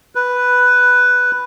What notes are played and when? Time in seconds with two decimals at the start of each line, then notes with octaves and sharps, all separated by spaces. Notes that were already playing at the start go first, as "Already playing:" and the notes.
0.15 B4